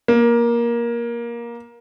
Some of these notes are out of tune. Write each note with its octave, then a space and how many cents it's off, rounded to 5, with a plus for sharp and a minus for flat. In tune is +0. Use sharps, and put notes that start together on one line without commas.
A#3 +15